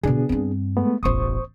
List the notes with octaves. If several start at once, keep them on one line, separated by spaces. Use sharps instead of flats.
B2 D3 B3 D4 G#4
G2 C4
G#3 A3 B3
E1 A1 C5 C#6 D#6